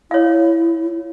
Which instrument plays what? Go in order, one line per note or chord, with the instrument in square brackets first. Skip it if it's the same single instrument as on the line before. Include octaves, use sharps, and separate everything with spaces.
[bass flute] E4 [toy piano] C#5 F5